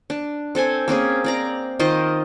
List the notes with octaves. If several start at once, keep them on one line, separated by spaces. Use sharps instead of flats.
D4
C4 A4 C5 G#5
A#3 C4 C#4 G#4
C4 D5 A#5
D#3 F4 C5 D#5